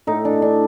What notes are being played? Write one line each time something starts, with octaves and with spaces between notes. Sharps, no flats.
A2 D#4
D4
A2
D4